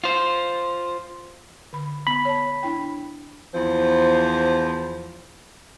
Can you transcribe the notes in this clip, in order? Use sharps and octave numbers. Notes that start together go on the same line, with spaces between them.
F4 C5
D3 B5
B3 B5
C#5 A5
D4 E4 G5
E2 F3 C5